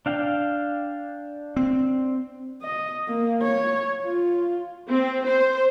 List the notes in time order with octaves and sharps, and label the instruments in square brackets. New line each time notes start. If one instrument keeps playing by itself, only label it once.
[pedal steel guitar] D4 F5 G5
[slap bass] C4
[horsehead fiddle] D#5
A#3
C#5
F4
[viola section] C4
C5